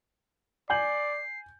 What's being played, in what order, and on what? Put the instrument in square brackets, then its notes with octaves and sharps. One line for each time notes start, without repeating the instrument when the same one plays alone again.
[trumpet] D5 [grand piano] G#5 G6 F#7 [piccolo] C7